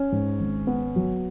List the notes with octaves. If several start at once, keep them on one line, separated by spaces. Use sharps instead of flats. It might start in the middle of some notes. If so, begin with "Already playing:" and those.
Already playing: C#4
G#2
G#1
B3
F#3